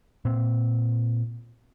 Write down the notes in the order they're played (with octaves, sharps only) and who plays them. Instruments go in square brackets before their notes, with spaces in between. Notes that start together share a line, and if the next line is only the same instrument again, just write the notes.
[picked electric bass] A#2 C4